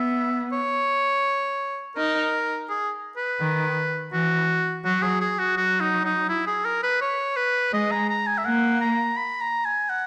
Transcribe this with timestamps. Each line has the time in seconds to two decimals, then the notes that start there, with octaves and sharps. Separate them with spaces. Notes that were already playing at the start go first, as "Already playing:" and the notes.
Already playing: B3 E5
0.52 C#5
1.97 D#4 A#4
2.69 G#4
3.17 B4
3.41 D#3
4.13 E3 F#4
4.85 F#3 F#4
5.02 G#4
5.20 G#4
5.39 F#4
5.57 F#3 F#4
5.80 D#4
6.05 D#4
6.29 E4
6.47 G#4
6.65 A#4
6.83 B4
7.01 C#5
7.37 B4
7.73 G#3 D#5
7.91 A#5
8.09 A#5
8.27 G#5
8.38 E5
8.45 A#3 F#5
8.81 A#5
9.17 B5
9.41 A#5
9.65 G#5
9.89 F#5